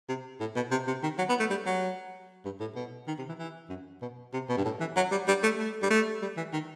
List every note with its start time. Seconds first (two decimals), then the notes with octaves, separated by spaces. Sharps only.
0.09 C3
0.40 A2
0.56 B2
0.71 C3
0.87 C3
1.03 D#3
1.18 F#3
1.29 B3
1.39 A3
1.50 G3
1.66 F#3
2.45 G2
2.60 A2
2.75 B2
3.07 D#3
3.18 C3
3.29 E3
3.39 E3
3.70 F#2
4.02 B2
4.33 C3
4.49 B2
4.57 G2
4.65 A2
4.80 E3
4.96 F#3
5.11 G3
5.27 G3
5.43 A3
5.59 A3
5.82 G3
5.90 A3
6.22 G3
6.37 E3
6.53 D#3